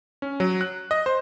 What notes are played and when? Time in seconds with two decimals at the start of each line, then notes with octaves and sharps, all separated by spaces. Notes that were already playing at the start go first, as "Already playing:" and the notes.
0.22 C#4
0.40 F#3
0.61 F#6
0.91 D#5
1.06 C5